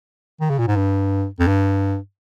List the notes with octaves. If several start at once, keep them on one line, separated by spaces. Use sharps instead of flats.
D#3
C#3
A#2
G#2
G2
F2
G2